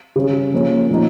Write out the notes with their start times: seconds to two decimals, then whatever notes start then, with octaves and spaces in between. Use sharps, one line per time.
0.16 C#3 G3 C#4
0.53 F3 A#3 C#4
0.90 A#2 F3 A#3 D#4